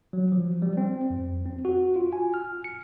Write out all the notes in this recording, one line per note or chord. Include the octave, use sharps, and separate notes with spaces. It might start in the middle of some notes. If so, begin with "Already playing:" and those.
F#3
F3
G3
C4
F2
C4
F#4
F4
G#5
F6
C#7